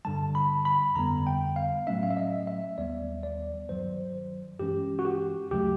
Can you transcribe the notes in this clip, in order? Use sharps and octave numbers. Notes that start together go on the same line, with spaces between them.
G2 D3 G3 A5
B5
B5
F2 D3 G3 B3 A#5
G5
F5
A2 F#3 A3 C#4 E5
F5
E5
D#5
E5
D#2 D#3 G3 B3 D5
D5
G2 D#3 F#3 C5
G2 E3 G#3 C#4 G4
F#4
G4
D2 C#3 F#3 A3 G4